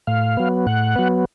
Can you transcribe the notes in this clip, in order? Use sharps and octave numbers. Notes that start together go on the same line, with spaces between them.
A2 F5
F#3 B3
A2 F#5
F#3 B3